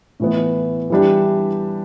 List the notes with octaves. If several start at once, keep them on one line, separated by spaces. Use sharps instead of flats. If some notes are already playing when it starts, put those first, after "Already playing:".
A2 E3 B3
E3 G3 D4 G4